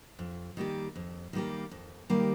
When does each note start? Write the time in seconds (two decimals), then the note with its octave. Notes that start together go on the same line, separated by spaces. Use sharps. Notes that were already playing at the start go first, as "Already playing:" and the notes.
0.19 F2
0.57 D#3 G3 A#3 G4
0.96 F2
1.33 D#3 G3 A#3 G4
1.71 F2
2.10 D#3 G3 A#3 G4